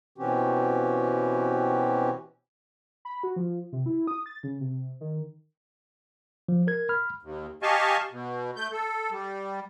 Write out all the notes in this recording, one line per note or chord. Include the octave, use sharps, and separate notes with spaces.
B2 E3 C4 C#4 F#4 G4
B5
F#4
F3
C3
E4
D#6
A6
C#3
C3
D#3
F3
A#4 G#6
B5 F6
D#2
G4 D#5 F5 G#5 A5 C#6
B2
A3 G6
A4
G3